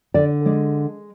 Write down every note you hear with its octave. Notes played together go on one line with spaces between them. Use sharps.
D3 D5
G#3 D5